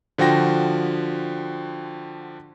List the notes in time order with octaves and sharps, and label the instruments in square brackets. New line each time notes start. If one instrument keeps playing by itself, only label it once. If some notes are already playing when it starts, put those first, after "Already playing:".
[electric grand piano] D3 F3 F#4 G5 A#6